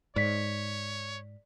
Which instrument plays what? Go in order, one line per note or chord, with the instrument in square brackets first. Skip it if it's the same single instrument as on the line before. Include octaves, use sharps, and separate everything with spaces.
[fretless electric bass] G#2 [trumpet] C#5 [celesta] D5 B6